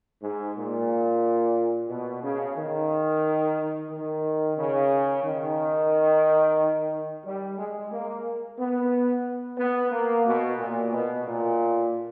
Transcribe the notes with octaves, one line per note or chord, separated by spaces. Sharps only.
G#2
A#2
B2
C#3
D#3
D#3
C#3
D#3
G3
G#3
A#3
B3
B3
A#3
B2
A#2
B2
A#2